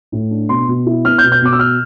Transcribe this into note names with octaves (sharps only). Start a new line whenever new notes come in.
A2
D4
B2 C6
B2
E4
B3 F6
G6
B2
G6
B2 D6
E6
F6